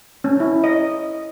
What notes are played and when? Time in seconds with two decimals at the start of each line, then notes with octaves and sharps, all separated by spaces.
0.24 C#4
0.40 E4
0.64 D#5